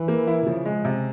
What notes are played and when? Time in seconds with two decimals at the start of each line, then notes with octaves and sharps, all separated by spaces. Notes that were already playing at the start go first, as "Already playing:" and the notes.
Already playing: E3
0.08 A#3
0.27 E4
0.47 C#3 F3
0.65 G#3
0.85 C3